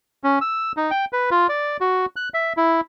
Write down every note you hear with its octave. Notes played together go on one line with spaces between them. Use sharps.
C#4
E6
D#4
G5
B4
F4
D5
F#4
F#6
E5
E4